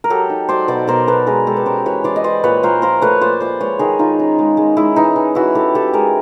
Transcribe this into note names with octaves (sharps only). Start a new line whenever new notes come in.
A#4
F#3 G4 A4
D#4
F#3 C5 D5
B2 C5 D5
B2 A#4 C5
B2 A4 B4
G#3 G#4 A#4
G#3 G4 A4
B4
C#4 A#4 C5
E3 B4 C#5
E3 C5 D5
D#5
E3 C5 D5
A#2 B4 C#5
A#2 A#4 C5
F3 A#4 C5
A3 B4 C#5
A#2 C5 D5
A#2 C5 D5
G#3 B4 C#5
D#3 G#4 A#4
D#3 D#4 F4
C#4
G#3
G#3
G#3 E4
E3 D#4
E3
E3 E4 F#4
E3 G4 A4
E3 G4 A4
G#3 G#4 A#4